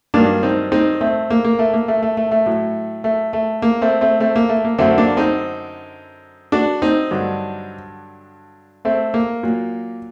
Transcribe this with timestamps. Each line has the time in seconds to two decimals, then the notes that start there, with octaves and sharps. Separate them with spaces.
0.14 G2 D#3 F#3 A#3 D4
0.43 C4 D#4
0.72 C4 D#4
1.01 A3 C4
1.30 A#3
1.44 A#3
1.59 A3
1.74 A#3
1.88 A3
2.03 A3
2.17 A3
2.31 A3
2.46 A2 F#3
3.04 A3
3.33 A3
3.62 A#3
3.82 A3 C4
4.01 A3 C4
4.20 A3 C4
4.36 A#3
4.49 A3
4.64 A#3
4.78 F#2 D3 F#3 A3 C4
4.98 A#3 D4
5.17 C4 D#4
6.52 D4 F#4
6.82 C4 D#4
7.11 G2 D3 F#3
8.85 A3 C4
9.14 A#3
9.43 A#2 F#3